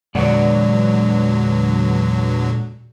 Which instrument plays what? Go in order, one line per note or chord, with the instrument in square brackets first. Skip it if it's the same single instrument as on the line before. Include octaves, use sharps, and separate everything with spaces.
[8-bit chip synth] E2 D3 F#3 [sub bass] A#2 [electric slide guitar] G#3 D5 F#5